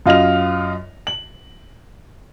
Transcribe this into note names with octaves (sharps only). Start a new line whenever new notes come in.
F#2 F4 D#5 F6 F7
F#7